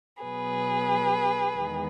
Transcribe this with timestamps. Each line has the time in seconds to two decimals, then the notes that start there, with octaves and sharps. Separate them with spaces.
0.23 B2 F#3 B3 G#4 B4
1.54 E2 D#3 G#3 B3